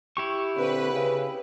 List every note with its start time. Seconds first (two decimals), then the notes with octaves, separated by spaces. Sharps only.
0.17 E4 G4 C#6
0.56 A#2 D3 C4 B4
0.91 C#3